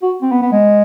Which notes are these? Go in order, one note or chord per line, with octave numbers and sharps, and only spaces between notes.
F#4
C4
B3
B3
G#3